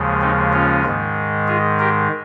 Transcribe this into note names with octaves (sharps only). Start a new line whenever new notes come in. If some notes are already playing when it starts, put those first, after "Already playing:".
Already playing: D#2 C#3 F3 G#3
C4 D#4
C#4 F4
G#2 D#3 G#3
F4 G#4
G4 A#4